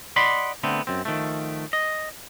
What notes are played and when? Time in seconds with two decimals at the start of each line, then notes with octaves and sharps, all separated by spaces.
0.16 D5 D#5 F#5 B5 C6
0.63 D3 A3 B3 C4
0.87 F#2 C4
1.05 D#3 F3 A3
1.73 D#5